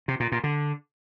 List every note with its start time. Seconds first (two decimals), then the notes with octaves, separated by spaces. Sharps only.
0.08 C3
0.20 A#2
0.32 A#2
0.44 D3